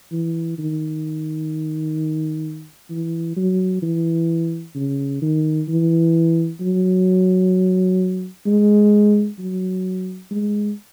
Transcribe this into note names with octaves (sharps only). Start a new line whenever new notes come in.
E3
D#3
E3
F#3
E3
C#3
D#3
E3
F#3
G#3
F#3
G#3